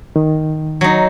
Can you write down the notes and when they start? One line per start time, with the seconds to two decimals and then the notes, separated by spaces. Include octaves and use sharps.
0.16 D#3
0.81 F#3 D#4